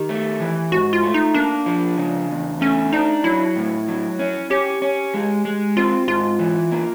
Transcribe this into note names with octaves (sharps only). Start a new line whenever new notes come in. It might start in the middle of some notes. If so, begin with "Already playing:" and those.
Already playing: D#3 G4
A3
E3
G#2 F#4
F4
A3
D#4
A#3 D4
F3
C#3
E2
A3 C#4
D4 D#4
F#3 E4
A2
F#3
C#4
C#4 G4
C#4
G#3
G#3
C4 F4
G#2 F4
E3
A#3